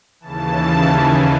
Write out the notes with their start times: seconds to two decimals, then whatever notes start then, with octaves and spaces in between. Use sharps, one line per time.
0.20 D#2 C#3 E3 A5
0.84 G#5